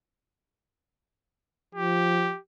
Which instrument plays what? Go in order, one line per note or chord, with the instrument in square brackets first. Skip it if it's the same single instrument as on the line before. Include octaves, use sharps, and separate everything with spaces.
[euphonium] F3 [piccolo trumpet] G4